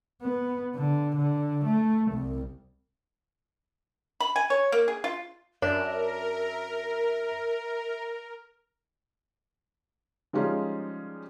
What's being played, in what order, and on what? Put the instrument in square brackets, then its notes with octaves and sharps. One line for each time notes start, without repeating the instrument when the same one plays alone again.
[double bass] B3
D3
D3
A3
C2
[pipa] B5
G#5
C#5
A#3
G#4
F4
[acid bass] F#2 [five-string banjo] D4 [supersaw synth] A#4 [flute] E5
[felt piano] F3 G3 G#3 C#4 D#4 F4